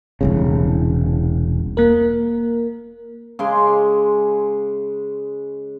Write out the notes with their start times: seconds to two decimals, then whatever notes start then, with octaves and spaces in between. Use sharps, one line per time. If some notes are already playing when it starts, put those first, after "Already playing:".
0.21 E1 C2 C#3
1.77 A#3 A#4
3.39 C#3 G#3 C6 D6